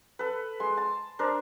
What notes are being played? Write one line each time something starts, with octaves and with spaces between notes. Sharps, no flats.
A4 B4
G#3 C6
A5
D4 A#4 C5